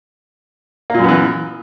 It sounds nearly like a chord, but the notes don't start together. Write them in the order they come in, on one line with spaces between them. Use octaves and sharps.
A#3 A#2 F#2 B3 E3